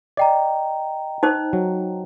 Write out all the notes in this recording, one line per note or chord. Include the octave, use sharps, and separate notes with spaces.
D5 D#5 G5 A#5
D#4 C5
F#3